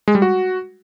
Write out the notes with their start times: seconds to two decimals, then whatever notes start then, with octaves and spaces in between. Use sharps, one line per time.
0.08 G#3
0.15 G3
0.22 F#4